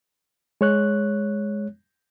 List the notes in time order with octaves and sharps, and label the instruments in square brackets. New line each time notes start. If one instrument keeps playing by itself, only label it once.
[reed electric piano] G#3 C#5 F#6